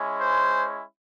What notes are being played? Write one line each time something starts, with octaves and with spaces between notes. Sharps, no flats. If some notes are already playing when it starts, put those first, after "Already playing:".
Already playing: G#3 C#4 E4
C5